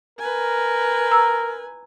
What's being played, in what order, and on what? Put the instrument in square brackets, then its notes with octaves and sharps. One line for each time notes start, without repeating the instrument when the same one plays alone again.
[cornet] A#4 [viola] B4 G#5
[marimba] A#5 E6